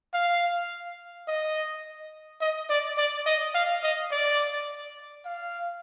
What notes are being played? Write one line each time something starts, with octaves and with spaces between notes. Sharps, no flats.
F5
D#5
D#5
D5
D5
D#5
F5
D#5
D5
F5